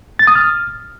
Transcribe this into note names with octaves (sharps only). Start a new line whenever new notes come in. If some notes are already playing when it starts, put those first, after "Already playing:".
A6
D#6
F6